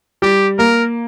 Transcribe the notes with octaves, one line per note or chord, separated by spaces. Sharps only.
G3 G4
A#3 A#4